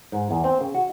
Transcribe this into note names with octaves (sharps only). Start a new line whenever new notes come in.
G#2
E2
C4
C#3
F#4